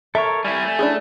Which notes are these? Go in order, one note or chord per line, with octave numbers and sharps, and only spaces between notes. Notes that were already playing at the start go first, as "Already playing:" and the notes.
A4 A#4 C#5 E5
G3 E4 G#5
A3
D4 E4 G#4